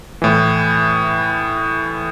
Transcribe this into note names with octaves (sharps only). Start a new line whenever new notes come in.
A2 E3